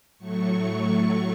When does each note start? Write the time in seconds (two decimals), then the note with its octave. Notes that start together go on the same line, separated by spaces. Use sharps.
0.18 A2 F#3 A3 C#6